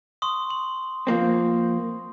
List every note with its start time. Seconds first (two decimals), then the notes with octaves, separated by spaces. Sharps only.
0.22 C6 C#6 D#6
0.50 F#7
1.07 F3 A#3 C4